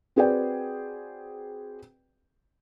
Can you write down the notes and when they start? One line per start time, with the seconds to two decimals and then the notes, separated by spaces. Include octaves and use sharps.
0.16 C4 F#4 G#4 B4 D5 G5